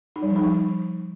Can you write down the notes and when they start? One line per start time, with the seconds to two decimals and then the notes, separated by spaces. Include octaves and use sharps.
0.16 D#4
0.22 G3
0.29 F3
0.36 D#4
0.43 F3